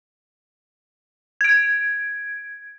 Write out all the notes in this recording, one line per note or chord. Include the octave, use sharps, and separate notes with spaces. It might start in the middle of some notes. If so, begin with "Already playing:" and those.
G#6 D7